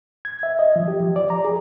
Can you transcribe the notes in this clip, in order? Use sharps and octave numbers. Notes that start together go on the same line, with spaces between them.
G#6
E5
D#5
F3
G4
F3
D5
A#5
G#4